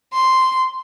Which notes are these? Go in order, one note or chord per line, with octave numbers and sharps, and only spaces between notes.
C6